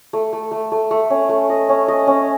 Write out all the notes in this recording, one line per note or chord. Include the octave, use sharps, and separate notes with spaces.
A3
A3
A3
A3
A3
C#4
A3
D#5
C#4
D#5
C#4